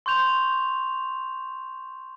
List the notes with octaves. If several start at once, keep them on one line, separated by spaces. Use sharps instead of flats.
C6 C#6 G6 F7